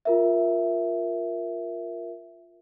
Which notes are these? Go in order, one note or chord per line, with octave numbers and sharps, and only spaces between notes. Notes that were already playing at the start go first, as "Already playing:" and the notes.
F4 A#4 E5